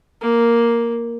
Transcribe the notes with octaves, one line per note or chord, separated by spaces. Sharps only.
A#3